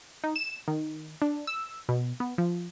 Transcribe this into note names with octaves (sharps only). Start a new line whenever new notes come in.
D#4
E7
D#3
D4
E6
B2
B3
F3